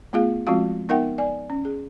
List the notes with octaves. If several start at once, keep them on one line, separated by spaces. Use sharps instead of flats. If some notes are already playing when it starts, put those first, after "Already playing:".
A3 B3 F4 G#4 F5
F3 G#3 C4 F4 F#4 F5
B3 D#4 A#4 E5 F#5 G5
D5 G#5
C#4
G#4